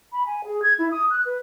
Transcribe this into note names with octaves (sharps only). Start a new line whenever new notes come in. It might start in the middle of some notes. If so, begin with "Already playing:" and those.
B5
G#5
G#4
G#6
E4
D#6
F#6
B4